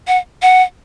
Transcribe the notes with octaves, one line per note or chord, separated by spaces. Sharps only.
F#5
F#5